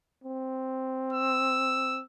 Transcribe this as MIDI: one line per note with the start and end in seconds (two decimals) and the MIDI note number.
0.24 2.01 60
1.13 2.03 88